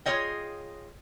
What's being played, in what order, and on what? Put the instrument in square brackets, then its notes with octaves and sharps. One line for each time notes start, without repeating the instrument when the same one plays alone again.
[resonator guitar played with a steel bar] F4 G#4 C#5 D#5 G5